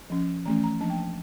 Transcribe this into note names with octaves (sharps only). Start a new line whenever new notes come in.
F3 C#4
E3 A3 C#4 A#5
A#5
F3 A#3 D4 A5
G5
A5